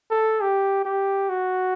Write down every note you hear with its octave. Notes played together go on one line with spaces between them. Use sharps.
A4
G4
G4
F#4